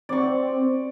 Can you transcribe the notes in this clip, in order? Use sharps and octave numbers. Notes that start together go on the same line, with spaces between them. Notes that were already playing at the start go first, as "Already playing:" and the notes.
C4 D5 C#6